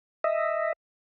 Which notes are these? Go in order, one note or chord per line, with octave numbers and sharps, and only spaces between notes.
D#5 E5